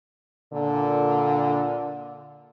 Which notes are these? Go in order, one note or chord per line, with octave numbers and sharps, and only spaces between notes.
A#2 D3